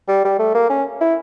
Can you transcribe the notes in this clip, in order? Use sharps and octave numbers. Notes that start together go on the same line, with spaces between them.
G3
G3
A3
A#3
C#4
E4